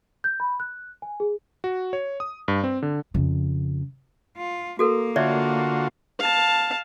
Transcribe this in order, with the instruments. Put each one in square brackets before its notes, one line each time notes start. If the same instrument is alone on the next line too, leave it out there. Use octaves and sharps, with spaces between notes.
[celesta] G6
B5
F#6
G#5
G#4
[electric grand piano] F#4
C#5
D#6
G2
C4
D3
[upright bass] F2 C#3
[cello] F4
[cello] A#3 [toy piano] F#4 A4 A#4
[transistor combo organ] D3 F4 F#4 [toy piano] C#5 D5 E5
[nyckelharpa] F5 A5